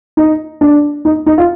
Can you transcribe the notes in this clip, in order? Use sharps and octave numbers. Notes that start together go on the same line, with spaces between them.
D#4
D4
D#4
D#4
F4